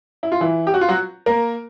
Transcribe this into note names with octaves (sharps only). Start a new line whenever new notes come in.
E4
F4
E3 E4
G4
F#4
F4
F#3 F#4
A#3 A#4